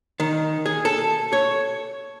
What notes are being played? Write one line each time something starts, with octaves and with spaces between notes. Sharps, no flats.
D#3
G#4
A4
C#5